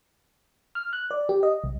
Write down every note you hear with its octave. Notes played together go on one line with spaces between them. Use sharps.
F6
F#6
D5
G4
D#5
C2